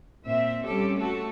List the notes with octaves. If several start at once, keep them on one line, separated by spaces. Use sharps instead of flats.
A#2 C4 E5
G3 C4 C#4 G4 A4
A3 F#4 A4